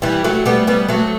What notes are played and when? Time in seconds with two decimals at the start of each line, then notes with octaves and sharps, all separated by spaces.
0.02 E3 G3
0.24 F#3 A3
0.46 G3 B3
0.67 G3 B3
0.88 F#3 A3